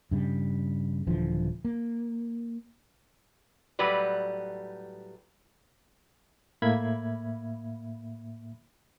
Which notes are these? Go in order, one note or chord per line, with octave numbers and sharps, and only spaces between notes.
G2 C#3 G3
D#1 D3 E3 F3
A#3
A2 F#3 G3 B4 D5
A2 A#3 E5 B5 G#6